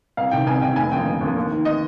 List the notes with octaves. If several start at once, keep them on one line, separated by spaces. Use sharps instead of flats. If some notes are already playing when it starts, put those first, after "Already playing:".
C2 F5
C3 D#3 G5
C2 G#5
C3 D#3 G5
F1 G#5
D#2 D3 F3 G5
F1
D#2 D3 F3
D#2
D#3
D#5